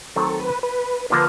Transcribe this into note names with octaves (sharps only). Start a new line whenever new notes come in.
D#3 F#3 A3 C4 A4
B4
B4
D3 F3 A#3 D4 B4